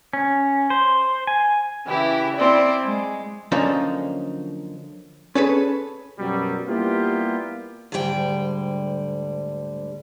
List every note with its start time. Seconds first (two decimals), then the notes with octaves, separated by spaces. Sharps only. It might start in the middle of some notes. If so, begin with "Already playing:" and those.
0.13 C#4
0.70 C5
1.27 G#5
1.86 C#3 E3 E4 G4
2.35 C4 E4 D5
2.84 G#3
3.52 D3 F3 F#3 A#3 C#4 D#4
5.35 C#4 G#4 A4 B4
6.19 F#2 B2 F#3 G3
6.68 G3 A#3 B3 E4 F4 G4
7.92 D2 G#2 D3 G3 G5